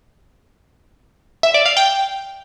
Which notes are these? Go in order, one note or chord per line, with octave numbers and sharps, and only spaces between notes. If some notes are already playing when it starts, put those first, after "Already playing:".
E5
D5
F5
G5